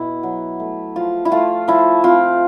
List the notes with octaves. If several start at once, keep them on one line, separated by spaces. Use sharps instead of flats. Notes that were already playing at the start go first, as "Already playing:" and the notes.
Already playing: B2 E4
F#3
A3
F3 F4
E4
A3 F4
F3 E4
C4 F4